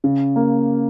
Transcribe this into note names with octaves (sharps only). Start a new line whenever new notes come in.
C#3
A#3